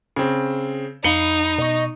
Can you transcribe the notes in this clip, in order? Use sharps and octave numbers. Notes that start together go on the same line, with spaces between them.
C#3 C4
F2 D#4 F5 B5 C7 C#7 F#7 G7
B2 D#5 C#6